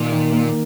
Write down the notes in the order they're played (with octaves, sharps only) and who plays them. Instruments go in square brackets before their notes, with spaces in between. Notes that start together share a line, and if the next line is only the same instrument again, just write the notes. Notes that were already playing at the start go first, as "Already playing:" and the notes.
Already playing: [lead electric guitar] A#2 [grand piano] D#3
[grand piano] D#3
A#3